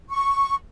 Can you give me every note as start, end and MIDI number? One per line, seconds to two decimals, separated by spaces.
0.10 0.55 85